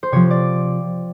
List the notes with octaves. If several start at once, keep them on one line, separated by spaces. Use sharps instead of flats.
C5
C3 F3 C#5
D5